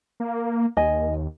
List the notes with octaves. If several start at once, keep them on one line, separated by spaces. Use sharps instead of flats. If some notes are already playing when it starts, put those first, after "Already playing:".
A#3
D#2 D#5 G#5